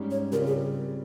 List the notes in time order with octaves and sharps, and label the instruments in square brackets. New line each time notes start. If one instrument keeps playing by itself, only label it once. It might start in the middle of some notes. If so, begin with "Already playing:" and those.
Already playing: [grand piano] G#2 G3 C#4
[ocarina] C#5
[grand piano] C#3 G3 C4 F4 [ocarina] A#4
[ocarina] G#4